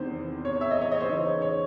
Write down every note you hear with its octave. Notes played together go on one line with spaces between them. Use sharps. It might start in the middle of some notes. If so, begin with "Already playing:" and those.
Already playing: E2 C3 D#3 C5
C#5
E5
D#5
C#5
D#5
C5
C#3 E3 C4 D#4 C#5
C#5